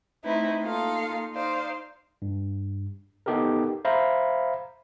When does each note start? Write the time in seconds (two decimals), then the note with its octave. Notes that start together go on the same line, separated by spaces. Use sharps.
0.23 A3 C4 D#4 E4 B4
0.62 A#3 D#4 F4 A4 F5
1.34 D#4 C5 D5 F5
2.22 G2
3.26 B3 D#4 G4 A4 A#4
3.85 C5 E5 F5 A#5 B5